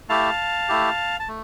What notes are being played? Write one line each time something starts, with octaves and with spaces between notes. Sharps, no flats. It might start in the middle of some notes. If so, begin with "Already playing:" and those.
A3 E4 G4 F5 A5
A3 E4 G4
A5
A3